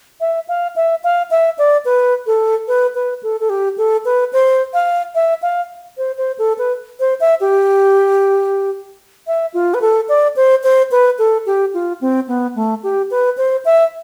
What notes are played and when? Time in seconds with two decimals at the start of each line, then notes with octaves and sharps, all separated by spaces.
0.21 E5
0.48 F5
0.76 E5
1.04 F5
1.31 E5
1.58 D5
1.85 B4
2.27 A4
2.68 B4
2.95 B4
3.23 A4
3.40 A4
3.50 G4
3.78 A4
4.05 B4
4.33 C5
4.74 F5
5.15 E5
5.42 F5
5.98 C5
6.18 C5
6.39 A4
6.58 B4
7.00 C5
7.20 E5
7.41 G4
9.27 E5
9.54 F4
9.74 B4
9.81 A4
10.09 D5
10.36 C5
10.63 C5
10.91 B4
11.19 A4
11.46 G4
11.74 F4
12.01 C4
12.28 B3
12.56 A3
12.83 G4
13.11 B4
13.37 C5
13.65 E5